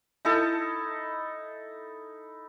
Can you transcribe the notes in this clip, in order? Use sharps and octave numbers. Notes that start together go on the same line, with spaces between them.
D#4 E4 A4 A5